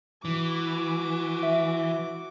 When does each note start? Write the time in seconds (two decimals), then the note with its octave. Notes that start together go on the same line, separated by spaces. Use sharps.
0.25 E3 F#4 D6
1.43 E5